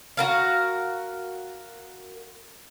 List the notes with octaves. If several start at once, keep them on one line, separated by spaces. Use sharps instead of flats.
F#4 A#4 F5